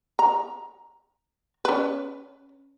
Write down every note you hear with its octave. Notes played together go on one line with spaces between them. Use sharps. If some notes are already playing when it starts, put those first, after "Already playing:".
A#5
C#4 B4